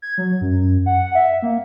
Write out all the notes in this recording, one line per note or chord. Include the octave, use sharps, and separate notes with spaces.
G#6
F#3
F#2
F#5
E5
A#3